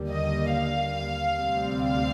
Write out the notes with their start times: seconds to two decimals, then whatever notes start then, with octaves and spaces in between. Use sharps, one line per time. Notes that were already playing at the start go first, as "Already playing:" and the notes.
Already playing: D#2 D3 G3 A#3
0.10 D#5
0.53 F5
1.40 D2 C3 G3 C4
1.83 F5